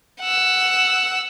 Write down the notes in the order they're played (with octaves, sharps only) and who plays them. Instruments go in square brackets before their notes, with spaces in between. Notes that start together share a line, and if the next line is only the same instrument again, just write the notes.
[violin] F#5 E6